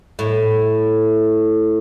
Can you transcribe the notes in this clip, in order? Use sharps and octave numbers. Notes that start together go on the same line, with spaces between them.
A2